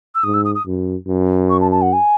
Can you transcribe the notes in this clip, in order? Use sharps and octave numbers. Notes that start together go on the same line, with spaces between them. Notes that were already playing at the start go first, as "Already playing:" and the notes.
E6
G#2 D#6
E6
D#6
D#6
F#2
F#2
C#6
A5
A5
F#5
G#5